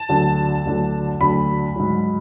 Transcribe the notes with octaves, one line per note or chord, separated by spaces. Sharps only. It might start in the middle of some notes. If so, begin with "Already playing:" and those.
Already playing: A5
D2 D3 F#3
D2 D3 F#3
D2 D3 F#3 B5
G#2 F#3